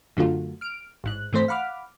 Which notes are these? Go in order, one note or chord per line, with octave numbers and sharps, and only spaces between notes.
F#2 D3 F#3 A3 F4
F6 D7
A1 G#2 F#6
G#2 E3 A3 C4 C5 B6
F5 F#5 B5 D6 F6